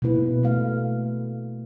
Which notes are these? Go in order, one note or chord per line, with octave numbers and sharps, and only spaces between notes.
B2 G#3 A#3 E4 B4
A3 F5